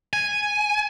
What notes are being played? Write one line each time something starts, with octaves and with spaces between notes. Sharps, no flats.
G#5